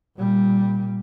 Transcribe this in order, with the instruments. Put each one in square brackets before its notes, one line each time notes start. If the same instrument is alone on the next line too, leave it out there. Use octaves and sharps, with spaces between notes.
[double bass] A#2 G3